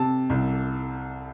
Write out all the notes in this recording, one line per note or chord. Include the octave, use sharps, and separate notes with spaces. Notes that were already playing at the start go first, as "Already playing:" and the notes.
Already playing: C3 A5
C2